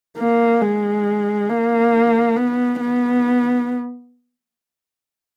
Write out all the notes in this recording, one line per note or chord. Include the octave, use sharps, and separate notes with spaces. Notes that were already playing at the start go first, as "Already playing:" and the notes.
A#3
G#3
A#3
B3
B3